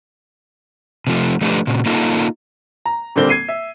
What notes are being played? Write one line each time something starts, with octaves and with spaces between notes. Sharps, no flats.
C3 F3 A3
F3 A3 D4 G4 B4
A#2 C#3
A#3 D#4 F4 A4
A#5
A#2 D3 G3 A#3 C4 G7
G#6 C7 D#7
E5